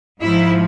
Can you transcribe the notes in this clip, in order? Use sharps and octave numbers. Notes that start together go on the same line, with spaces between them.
G#2 F3 E4